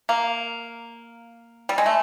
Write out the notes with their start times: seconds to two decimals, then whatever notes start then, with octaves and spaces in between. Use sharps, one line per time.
0.09 A#3
1.69 G3
1.78 G#3
1.86 A3